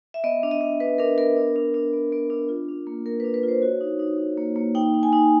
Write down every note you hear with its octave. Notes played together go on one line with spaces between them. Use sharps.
E5
B3 D#5
D4
D#5
D4
D4 B4
D4 A#4
B3 A#4
D4
D4
D4
B3
B3
D4
F4
D4
A#3
A#3 A#4
D4 B4
B4
F4
C5
F#4 C#5
D#4
D#4
D#4
A#3
A#3
D#4 G5
D#4
G#5
D#4